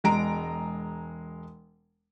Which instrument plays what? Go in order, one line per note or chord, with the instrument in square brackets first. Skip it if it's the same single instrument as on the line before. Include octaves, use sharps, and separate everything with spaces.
[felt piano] E1 G#3 A#5 D7